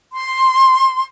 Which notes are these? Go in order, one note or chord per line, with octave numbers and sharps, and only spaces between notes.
C6